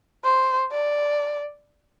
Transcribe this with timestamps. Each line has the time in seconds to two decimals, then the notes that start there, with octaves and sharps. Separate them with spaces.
0.24 C5
0.72 D5